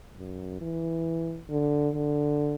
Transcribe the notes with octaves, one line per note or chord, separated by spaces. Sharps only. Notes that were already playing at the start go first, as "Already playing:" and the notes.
F#2
E3
D3
D3